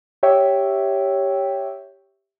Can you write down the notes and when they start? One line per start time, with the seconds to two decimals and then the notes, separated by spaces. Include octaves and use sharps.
0.23 G4 C#5 E5 G5